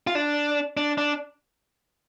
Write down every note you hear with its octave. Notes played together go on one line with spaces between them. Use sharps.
F4
D4
D4
D4